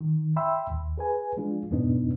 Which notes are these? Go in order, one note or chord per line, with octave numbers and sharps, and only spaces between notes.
D#3
E5 G5 B5 C6 E6
D#2
G#4 B4 G#5
F3 G#3 D4 F4
F2 G#2 B2 B3 D4 D#4